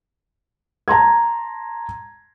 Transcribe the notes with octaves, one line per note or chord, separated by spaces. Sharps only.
A5 A#5 C6 G#6